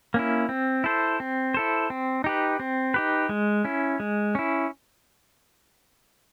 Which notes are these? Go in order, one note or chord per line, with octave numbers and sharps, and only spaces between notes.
A#3 C#4 E4
C4
E4 A4 C5
C4
E4 A4 C5
C4
D#4 G4 B4
C4
D#4 G4 B4
G#3
C#4 E4
G#3
C#4 E4